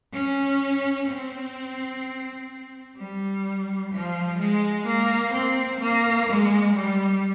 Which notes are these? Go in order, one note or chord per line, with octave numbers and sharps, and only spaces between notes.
C#4
C4
G3
F3
G#3
A#3
C4
A#3
G#3
G3